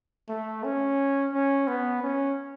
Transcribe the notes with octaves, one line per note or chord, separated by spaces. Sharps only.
A3
C#4
C#4
B3
C#4